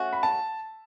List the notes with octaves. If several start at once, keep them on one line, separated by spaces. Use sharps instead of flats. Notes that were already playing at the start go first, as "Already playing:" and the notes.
Already playing: A3 C#4 F#4
B5
A5